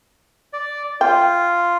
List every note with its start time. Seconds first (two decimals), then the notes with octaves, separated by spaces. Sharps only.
0.53 D5
1.01 F4 G5